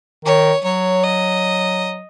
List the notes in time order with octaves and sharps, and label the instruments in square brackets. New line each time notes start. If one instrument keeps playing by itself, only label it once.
[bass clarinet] D#3 [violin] C#5
[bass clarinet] F#3 [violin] C#5
[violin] D#5